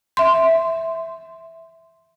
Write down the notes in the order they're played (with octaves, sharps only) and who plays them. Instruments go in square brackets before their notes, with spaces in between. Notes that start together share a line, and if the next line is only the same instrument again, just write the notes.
[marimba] E5 C6